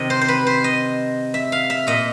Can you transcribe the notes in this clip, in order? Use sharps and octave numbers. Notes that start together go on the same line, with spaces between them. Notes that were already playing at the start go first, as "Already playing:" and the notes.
Already playing: C3 D#3 D#5
C5
C5
B4
C5
D#5
E5
F5
E5
A#2 D#5